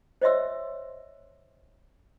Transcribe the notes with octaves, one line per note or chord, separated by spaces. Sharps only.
C5 C#5 D#5 E5 C6 E6